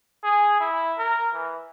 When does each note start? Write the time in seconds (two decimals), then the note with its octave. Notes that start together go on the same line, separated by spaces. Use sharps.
0.24 G#4
0.60 E4
0.98 A#4
1.33 E3